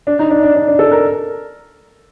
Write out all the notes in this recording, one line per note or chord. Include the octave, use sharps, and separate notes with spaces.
D4
D#4
D4
D4
D4
D4
A4
A#4